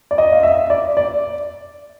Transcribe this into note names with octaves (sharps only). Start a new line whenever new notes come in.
D5
D#5
F5
E5
D5
D5